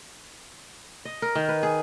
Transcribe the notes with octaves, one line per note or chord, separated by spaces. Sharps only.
D#5
A#4
D#3
B4
G#4